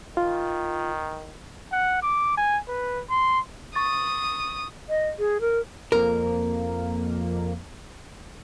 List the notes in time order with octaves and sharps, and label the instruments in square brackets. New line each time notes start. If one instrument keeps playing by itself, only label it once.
[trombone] D#3 [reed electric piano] F4
[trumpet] F#5
D6
G#5
B4
C6
[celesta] C#6 A6 [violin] D#6
[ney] D#5
G#4
A#4
[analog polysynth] F2 A#3 [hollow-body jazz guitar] A#4